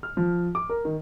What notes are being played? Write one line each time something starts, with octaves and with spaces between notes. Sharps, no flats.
F6
F3
D6
A#4
D#3